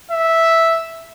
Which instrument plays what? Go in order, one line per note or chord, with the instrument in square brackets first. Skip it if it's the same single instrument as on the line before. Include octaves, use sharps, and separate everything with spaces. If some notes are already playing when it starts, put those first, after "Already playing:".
[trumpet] E5